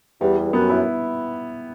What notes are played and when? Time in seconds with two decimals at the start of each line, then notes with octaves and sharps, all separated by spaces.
0.21 E2 G3
0.38 G3
0.53 F#2 B3
0.70 E4